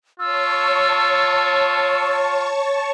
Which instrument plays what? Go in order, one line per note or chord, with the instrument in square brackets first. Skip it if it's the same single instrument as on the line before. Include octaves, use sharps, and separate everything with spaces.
[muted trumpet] F4 [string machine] C#5 A5 C#6 [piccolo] E6